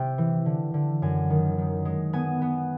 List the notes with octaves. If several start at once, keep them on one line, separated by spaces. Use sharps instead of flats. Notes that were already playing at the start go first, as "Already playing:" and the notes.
Already playing: C3 E5 G5
E3
D3
D3
F#2 G#5
D#3
D#3
G#3
B3 G#5
B3